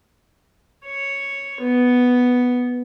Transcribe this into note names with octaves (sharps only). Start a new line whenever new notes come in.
C#5
B3